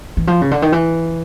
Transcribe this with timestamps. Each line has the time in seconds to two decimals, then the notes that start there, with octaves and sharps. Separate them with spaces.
0.17 E3
0.27 F3
0.41 C#3
0.51 D3
0.62 D#3
0.72 E3